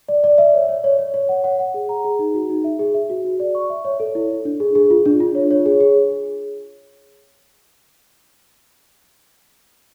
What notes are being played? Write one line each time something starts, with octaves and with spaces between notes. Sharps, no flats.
D5
D5
E5
C#5
C#5
C#5
C#5
C#5
F#5
F#5
F#5
G#4
A#5
G#4
D#4
F#4
D#4
E5
G#4
E5
F#4
F#4
D5
C#6
E5
C#5
A4
E4
E4
D4
G#4
G#4
F4
D4
F4
C#5
C#5
G#4
G#4